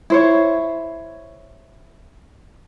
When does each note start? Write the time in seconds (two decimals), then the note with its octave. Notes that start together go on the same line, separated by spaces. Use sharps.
0.10 E4 C5 C#5